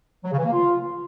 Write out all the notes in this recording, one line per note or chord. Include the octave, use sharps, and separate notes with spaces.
F#3
C#3
E3
A#3
F4